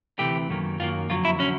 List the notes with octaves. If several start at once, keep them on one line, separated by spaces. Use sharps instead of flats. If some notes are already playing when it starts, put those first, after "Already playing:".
D2 C3 E3 A3 G4
F#2 D#3 F#3 A#3
F#2 D#3 F#3 A#3 F4
F2 D3 F#3 F4
E4
D3 F#3 C#4